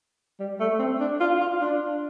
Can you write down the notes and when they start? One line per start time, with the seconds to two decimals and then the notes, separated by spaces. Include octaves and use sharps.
0.40 G3
0.60 A3
0.79 C4
1.00 D4
1.20 F4
1.40 F4
1.61 D4